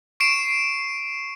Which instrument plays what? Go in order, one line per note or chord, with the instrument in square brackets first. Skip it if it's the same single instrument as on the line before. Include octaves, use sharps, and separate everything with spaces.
[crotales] C#6 C7 D7 E7